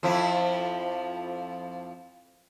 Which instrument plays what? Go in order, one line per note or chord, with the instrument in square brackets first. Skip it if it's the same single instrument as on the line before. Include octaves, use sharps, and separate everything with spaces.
[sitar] F2 F3 E4